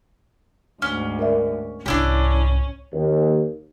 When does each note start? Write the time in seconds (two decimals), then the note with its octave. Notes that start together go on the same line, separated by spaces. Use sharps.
0.82 D2 G#2 C#4 F6
1.19 A#4 D5 E5
1.86 C2 G#2 C#4 D4 E4 G4
2.92 D#2